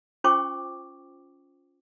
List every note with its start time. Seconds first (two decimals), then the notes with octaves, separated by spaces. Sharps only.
0.24 C#4 F4 C5 G5 C#6 D6